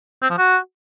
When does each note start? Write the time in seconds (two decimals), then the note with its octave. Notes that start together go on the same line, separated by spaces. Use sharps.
0.22 C4
0.30 F3
0.38 F#4